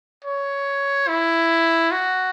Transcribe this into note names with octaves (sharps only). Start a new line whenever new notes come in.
C#5
E4
F#4